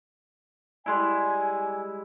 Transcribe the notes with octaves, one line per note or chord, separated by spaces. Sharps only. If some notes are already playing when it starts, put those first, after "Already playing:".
G3 G#3 E4 G#5